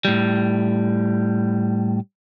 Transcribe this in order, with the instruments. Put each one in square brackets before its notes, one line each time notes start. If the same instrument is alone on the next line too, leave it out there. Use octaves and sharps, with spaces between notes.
[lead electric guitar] A2 G3